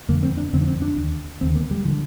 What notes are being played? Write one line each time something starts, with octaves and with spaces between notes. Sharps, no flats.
F2 D3 A#3
C4
D4
F2 D3 C4
D4
C4
D4
D#2 D3
D#2 D3 C4
A#3
G3
F3
D3